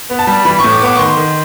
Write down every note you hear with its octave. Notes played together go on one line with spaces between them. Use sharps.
B3
A5
G3
E3 B5
C#6
A2
D6
B3 D6
C#6
D#3 C6
D#3